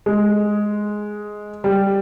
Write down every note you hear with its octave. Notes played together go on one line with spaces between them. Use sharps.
G#3
G3